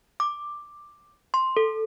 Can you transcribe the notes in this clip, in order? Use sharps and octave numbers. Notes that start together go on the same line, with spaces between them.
D6
C6
A4